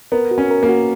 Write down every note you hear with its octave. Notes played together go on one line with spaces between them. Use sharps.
B3 A#4
F#4
C#4
A#4
A#3
F#4